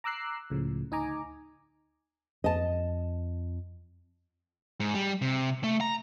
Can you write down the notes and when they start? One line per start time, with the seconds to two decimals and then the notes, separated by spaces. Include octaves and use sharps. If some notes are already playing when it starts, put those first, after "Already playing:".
0.04 A#5 D6 E6 F#6 C7
0.50 C#2 A2 C#3 F3
0.91 D2 D#4 D#5 G#5 A#5 D6
2.44 F2 D#5 A5
4.80 G#2
4.94 G3
5.22 C3
5.64 A3
5.81 A#5